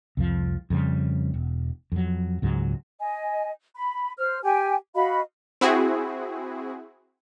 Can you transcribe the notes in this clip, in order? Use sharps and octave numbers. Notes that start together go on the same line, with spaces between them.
C2 F2 F3
F2 C#3 G3
E1
F2 F#3
C#2 G#2 F#3
D#5 G#5
B5
C5 F6
G4 G5 G#5
F#4 D#5 F5 B5
C4 E4 F#4 G#4